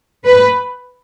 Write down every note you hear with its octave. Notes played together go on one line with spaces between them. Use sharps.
B4